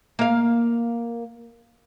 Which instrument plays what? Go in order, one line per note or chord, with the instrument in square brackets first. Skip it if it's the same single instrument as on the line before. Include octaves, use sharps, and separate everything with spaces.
[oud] A#3 F5